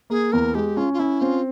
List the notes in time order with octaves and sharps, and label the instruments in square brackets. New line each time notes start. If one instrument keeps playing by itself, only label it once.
[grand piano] A#3 [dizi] G#4
[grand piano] E2 [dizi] A#4
[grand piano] G#3 [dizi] G4
[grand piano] C#4 [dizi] F4
[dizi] F4
[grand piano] C#4 [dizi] E4
[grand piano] C4 [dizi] F4